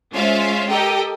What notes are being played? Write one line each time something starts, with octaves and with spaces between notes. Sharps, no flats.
G#3 C#4 F4 C5 E5 F5
G4 A4 A#4 D#5 G5